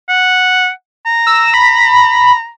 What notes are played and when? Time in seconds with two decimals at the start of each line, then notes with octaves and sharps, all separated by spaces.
0.09 F#5
1.06 A#5
1.27 E6
1.54 B5